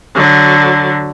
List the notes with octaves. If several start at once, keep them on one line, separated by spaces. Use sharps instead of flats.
D3 F#3